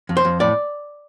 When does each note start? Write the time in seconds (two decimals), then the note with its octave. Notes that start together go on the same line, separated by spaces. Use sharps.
0.09 F2
0.17 C5
0.25 F2
0.40 A2 D5